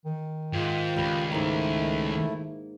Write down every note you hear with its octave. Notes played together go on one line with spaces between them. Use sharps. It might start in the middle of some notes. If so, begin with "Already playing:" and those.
D#3
G#2 F4 G5
C#2 G3 B4
G#2 A3 A#3 E4